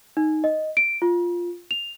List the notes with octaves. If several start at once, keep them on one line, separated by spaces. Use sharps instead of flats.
D#4
D#5
D7
F4
F7